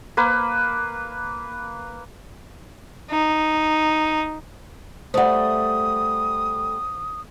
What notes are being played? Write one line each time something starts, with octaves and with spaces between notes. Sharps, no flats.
A#3 B4
D#4
G3 A3 C5 F#5 D#6